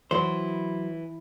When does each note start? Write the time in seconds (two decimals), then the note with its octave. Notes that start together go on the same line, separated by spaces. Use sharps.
0.11 E3 F#3 C5